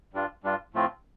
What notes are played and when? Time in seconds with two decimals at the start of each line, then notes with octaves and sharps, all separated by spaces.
0.14 G2 G3 D4 F4
0.44 G2 G3 D4 F4
0.74 A2 F3 A3 C4 F4